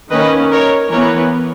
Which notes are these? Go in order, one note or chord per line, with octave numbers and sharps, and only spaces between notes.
D#3 A#3 C#4 B4 D#5
A#4 C#5
E3 B3 A#4 C#5